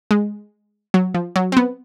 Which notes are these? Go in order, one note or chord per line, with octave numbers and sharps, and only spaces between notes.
G#3
F#3
F3
F#3
C4
B3